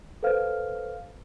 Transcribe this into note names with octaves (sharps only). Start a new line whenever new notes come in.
A4 B4 C5 F5 F6